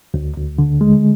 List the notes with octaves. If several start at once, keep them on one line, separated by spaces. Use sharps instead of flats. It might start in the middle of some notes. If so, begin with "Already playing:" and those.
D2
D2
D3
G#3